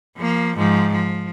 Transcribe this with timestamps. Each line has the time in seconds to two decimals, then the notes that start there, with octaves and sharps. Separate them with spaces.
0.17 F3 A#3
0.57 G#2 F3
0.93 F3